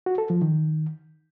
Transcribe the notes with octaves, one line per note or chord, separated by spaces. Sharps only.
F#4
A4
F3
D#3